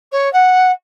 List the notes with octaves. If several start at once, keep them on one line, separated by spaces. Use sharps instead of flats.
C#5
F#5